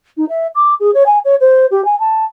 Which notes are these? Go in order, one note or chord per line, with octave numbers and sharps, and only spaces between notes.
D#4
E5
D6
G#4
C#5
G#5
C#5
C5
G4
G#5
A5